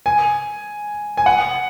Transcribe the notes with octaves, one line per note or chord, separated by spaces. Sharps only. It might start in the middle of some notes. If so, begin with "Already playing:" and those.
G#5
G#5
F#5